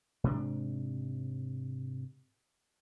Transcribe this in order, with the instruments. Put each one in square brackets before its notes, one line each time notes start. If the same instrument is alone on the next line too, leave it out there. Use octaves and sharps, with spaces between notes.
[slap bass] G#2 C3 D4